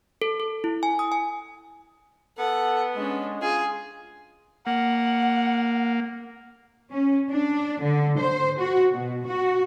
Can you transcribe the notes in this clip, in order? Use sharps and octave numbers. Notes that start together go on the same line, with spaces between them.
A4
A4
E4
G#5
D#6
G#5
B3 A4 F#5
G#3 C#4 D4
F4 G#4
A#3 F#5
C#4
D4
D3
C5
F#4
B2
F#4